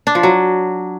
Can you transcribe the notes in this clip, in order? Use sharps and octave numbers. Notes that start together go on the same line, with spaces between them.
D4
F3
F#3